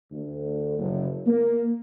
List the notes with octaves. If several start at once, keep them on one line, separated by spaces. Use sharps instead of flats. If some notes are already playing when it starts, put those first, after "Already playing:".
D2
F#1
A#3